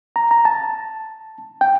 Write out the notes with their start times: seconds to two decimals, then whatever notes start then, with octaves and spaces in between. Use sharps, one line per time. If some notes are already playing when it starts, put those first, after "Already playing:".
0.16 A#5
0.31 A#5
0.45 A5
1.61 G5